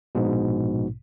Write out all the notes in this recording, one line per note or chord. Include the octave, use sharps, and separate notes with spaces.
A#1 G#2 B2